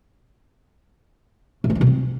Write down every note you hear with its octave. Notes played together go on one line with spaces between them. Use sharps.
A2
G3
G#3
B2
C4